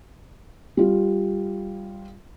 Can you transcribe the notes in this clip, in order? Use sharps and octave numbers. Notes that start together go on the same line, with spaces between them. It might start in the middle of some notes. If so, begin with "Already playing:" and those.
G3 F4